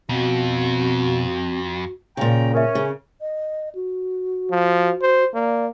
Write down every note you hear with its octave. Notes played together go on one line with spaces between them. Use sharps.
F2 B2 C4 F#4
A#2 C#3 C#4 G5 A#5
C#4 A#4 E5
C#3
D#5
F#4
F3
C5
A#3 D5